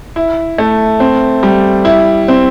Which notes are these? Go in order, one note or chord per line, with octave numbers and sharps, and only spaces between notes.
E4
A3
C4
G3
E4
C4